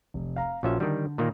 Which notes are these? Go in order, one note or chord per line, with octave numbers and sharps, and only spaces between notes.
F1
F5 A#5
A#1 C#4 F4 F#4 E5
D3 D#3 G3
A#2 D#3 A#3